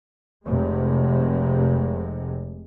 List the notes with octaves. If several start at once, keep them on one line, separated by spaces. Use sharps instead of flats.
F1 C3 G#3